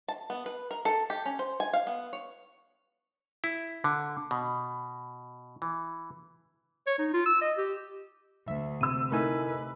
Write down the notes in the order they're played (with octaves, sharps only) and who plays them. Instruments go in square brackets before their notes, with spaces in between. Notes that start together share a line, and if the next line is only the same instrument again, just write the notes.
[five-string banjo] A5
B3
B4
A#4
A4
G4
C#4
C5
G#5
F5
B3
C#5
[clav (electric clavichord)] E4
D3
B2
E3
[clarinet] C#5
D#4
F4
E6
D#5
G4
[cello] D2 [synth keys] E5
[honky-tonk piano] C3 E6 [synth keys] D#7
[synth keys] A3 D#4 [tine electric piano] E4 A#4 G#5 [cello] B4